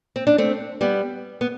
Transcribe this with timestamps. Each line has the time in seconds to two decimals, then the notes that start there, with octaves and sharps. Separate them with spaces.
0.16 C4
0.27 D4
0.38 A3 C4
0.81 G3 B3
1.41 B3